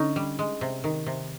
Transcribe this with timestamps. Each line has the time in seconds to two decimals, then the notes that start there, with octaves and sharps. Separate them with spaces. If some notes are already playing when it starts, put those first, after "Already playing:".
Already playing: D3 C#4 D#4
0.16 G3
0.39 G#3
0.61 C3
0.84 D#3
1.07 C3